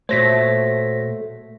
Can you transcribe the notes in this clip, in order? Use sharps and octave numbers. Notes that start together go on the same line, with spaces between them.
A#2 A3 F#4 C5 C#5 A#6 B6